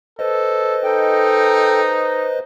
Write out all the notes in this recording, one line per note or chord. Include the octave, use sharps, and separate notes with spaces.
A4 B4 C5 D#5
D#4 A4 G5